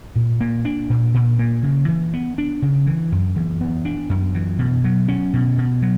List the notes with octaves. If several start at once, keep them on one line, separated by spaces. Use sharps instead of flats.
A#2
A#3
D4
A#2
A#2
A#3
C#3
E3
B3
D4
C#3
E3
F#2
E3
B3
D4
F#2
E3
B2
F#3
C#4
B2
B2
F#3